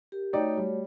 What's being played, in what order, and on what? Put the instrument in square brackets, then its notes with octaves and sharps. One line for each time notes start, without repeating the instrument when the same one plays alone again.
[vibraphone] G4 A#4
[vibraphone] A3 F#4 C#5 [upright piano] D#4 D5 G5
[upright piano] G3